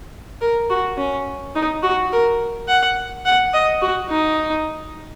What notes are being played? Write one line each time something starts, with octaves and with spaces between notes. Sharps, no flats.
A#4
F#4
C#4
D#4
F#4
A#4
F#5
F#5
D#5
F#4
D#4